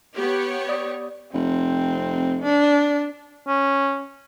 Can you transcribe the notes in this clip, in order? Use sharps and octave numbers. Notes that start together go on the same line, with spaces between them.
B3 G4 C#5
D5 D#6
F1 C4
D4
C#4